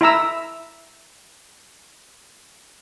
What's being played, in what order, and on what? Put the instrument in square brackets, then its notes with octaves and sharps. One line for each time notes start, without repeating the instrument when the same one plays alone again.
[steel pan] E4 E5 A#5 E6